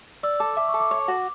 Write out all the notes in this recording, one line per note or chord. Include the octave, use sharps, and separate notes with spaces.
D5 E6
A4 D6
E5 D6
C#6
A4
D6
C#5
F#4